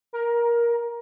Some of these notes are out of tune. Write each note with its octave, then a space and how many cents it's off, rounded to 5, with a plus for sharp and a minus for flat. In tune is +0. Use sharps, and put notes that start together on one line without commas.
A#4 +15